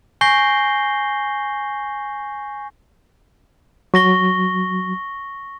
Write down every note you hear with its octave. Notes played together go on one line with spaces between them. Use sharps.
G#5 C#6 G6 A#6 C7 G7
F#3 C#6 A#6 G7